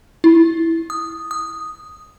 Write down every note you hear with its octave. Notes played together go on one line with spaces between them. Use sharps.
E4
D#6
D#6